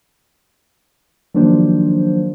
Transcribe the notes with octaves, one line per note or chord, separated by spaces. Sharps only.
D#3 F3 F#3 A#3 D4 C5